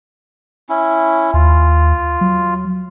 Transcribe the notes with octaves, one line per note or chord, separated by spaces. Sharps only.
C#4 E4
D#2 F4
F#3